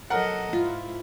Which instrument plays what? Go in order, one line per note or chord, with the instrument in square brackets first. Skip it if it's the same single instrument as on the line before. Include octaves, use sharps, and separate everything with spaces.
[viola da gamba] F#3 A4 D#5 [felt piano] A#4 F#5
[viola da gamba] G#2 E4 [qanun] F4